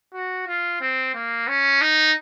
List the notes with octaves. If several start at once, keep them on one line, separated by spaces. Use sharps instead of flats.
F#4
F4
C4
A#3
C#4
D#4